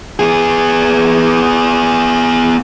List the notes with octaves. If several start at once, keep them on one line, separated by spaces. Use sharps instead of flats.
B3 G#4